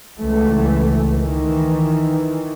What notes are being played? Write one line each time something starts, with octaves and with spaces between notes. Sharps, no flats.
C#2 E3 A3
D#3 E3